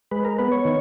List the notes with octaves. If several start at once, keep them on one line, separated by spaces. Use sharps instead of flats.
G#3 B4
A#4
B3 B4
C#5
D#3